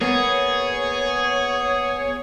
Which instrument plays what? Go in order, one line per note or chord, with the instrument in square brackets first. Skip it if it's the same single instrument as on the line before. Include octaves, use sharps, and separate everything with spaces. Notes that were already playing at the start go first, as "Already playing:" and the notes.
[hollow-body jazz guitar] A#3 B3 [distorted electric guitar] G#4 [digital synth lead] C#5